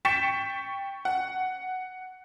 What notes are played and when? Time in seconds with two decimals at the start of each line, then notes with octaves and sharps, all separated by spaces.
0.05 G5 C#6 A6 B6 C#7 E7
1.05 F#5